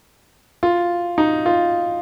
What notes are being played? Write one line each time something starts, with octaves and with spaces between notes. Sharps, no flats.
F4
D#4
F4